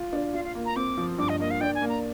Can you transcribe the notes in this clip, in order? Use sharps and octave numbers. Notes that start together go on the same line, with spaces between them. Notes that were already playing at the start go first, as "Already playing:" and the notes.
Already playing: F4
D4
F4 F5
F5
A#3
A#5
C4 D6
F3
G2 D6
D#5
A#3 D#5
F5
D4 G5
G#5
A#3
A#5